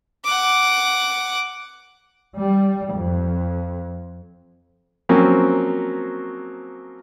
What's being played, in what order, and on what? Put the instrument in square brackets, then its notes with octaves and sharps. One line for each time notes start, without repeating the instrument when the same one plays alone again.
[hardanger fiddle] F#5 D6
[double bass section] G3
F2
[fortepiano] F3 F#3 A#3 C4 C#4